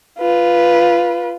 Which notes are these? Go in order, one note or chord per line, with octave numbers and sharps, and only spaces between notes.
F4 B4